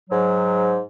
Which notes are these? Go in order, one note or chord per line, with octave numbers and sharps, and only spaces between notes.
G#2 F#3